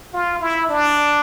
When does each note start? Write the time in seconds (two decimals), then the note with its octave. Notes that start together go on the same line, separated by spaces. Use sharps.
0.13 F4
0.41 E4
0.70 D4